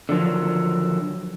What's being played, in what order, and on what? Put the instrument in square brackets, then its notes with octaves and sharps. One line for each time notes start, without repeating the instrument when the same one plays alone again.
[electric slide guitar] D3 D#3 F3 F#3